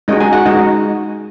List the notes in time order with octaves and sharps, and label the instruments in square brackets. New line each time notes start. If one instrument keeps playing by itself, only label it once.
[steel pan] G#3 C#4 D#4 F#4 D#5
G#4 G#5
F#4 F#5
G#3 D#4 F#4 D#5